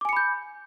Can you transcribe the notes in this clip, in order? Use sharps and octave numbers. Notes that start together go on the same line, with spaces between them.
G#5 B5 D6 G6 C#7